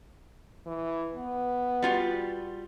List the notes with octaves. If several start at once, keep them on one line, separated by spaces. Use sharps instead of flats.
E3
B3
G3 F4 F#4